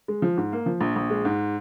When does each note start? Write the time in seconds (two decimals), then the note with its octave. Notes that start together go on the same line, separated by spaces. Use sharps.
0.08 G#3
0.22 F3
0.37 G#2
0.52 A#3
0.66 F3
0.81 A#1
0.96 A#1
1.10 G#3
1.25 G#2